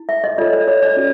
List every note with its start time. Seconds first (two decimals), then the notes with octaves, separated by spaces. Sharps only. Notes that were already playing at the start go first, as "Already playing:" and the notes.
Already playing: E4
0.09 E5
0.24 D#5
0.38 F4 A4 C#5 D5
0.53 D5
0.68 C#5
0.83 D5
0.97 C#4 F#4